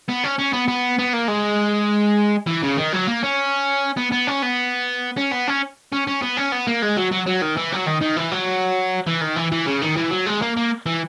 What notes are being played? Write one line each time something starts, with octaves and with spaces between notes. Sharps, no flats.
B3
C#4
C#4
B3
B3
B3
A#3
G#3
E3
C#3
D#3
F#3
A#3
C#4
B3
B3
C#4
B3
C#4
B3
C#4
C#4
C#4
B3
C#4
B3
A#3
G#3
F#3
F#3
F#3
D#3
E3
F#3
D#3
D#3
E3
F#3
E3
D#3
E3
E3
C#3
D#3
E3
F#3
G#3
A#3
A#3
E3